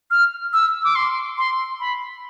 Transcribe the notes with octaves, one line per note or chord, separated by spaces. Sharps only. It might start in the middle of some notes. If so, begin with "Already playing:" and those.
F6
E6
D6
C6
C6
B5